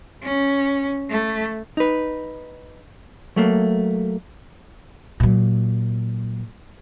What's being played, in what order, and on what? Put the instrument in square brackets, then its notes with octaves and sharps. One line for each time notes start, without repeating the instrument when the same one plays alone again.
[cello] C#4
A3
[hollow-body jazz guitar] D#4 B4
F#3 A3 A#3
[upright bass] A#2 F#3